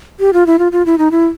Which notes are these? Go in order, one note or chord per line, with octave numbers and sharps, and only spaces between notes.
G4
F4
E4
F4
F4
E4
D#4
E4